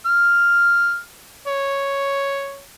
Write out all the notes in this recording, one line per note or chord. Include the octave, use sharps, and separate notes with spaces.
F6
C#5